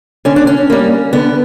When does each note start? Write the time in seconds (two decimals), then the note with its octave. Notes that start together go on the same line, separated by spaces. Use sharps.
0.25 D3 C#4
0.36 D4
0.47 C#4
0.70 G3 A#3
1.13 D3 B3